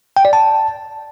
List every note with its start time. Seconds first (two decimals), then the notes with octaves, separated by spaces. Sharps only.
0.17 G5
0.25 D5
0.33 A5